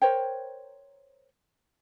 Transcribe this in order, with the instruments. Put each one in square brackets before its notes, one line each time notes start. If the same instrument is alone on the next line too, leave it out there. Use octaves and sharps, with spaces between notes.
[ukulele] A#4 C5 C#5 G5